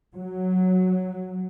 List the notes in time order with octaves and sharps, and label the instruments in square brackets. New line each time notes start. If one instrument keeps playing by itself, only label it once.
[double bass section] F#3